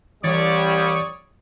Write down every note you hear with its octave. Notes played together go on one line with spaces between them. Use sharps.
C2 E3 G3 C#5 D5 D#6 A6